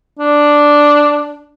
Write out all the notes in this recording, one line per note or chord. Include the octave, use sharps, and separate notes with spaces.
D4